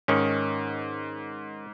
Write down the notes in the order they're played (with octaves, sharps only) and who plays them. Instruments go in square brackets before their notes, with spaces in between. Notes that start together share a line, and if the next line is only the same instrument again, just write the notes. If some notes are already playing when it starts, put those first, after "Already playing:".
[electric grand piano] G#2 [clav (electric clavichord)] D#3 C#4